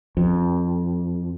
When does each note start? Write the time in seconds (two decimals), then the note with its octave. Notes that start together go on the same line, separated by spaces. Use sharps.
0.17 F2